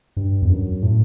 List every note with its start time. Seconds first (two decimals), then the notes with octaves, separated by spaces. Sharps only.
0.17 G2
0.42 E2
0.49 F#2
0.83 A2